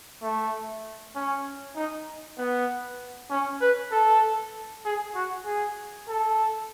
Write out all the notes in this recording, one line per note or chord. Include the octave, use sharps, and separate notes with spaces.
A3
C#4
D#4
B3
C#4
B4
A4
G#4
F#4
G#4
A4